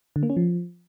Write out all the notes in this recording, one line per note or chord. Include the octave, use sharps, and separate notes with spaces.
D3
A#3
C#4
F3